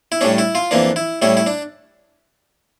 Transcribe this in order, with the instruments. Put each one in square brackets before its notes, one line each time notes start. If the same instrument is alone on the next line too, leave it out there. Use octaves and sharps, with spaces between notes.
[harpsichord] E4
A2 G3 C#4 D4
E4
F4
F2 E3 A#3 D4
E4
A2 G3 C#4 E4
E4
D4